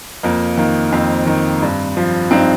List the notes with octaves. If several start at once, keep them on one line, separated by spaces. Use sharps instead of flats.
F2 A#3
D#3 A#3
F2 C4
D#3
G2
F3
G2 C4 D#4